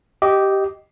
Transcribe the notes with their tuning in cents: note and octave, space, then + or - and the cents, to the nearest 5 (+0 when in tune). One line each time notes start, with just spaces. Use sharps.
G4 -10 D#5 +0